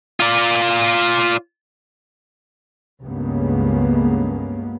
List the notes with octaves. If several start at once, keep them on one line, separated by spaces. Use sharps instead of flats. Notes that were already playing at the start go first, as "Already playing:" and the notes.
F4 D5
C#2 G2 C#3 G#3 A#3 B3